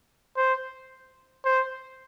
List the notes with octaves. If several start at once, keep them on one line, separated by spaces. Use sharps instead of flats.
C5
C5